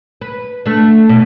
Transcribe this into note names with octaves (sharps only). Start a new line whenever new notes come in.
B4
A3 D4
B2